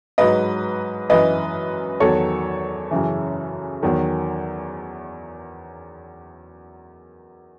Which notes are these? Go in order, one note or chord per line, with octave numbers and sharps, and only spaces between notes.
G#2 F#3 B4 D#5
F#2 E3 B4 D#5
E2 D#3 F#3 A4 C#5
F#2 C#3 E3
E2 D#3 F#3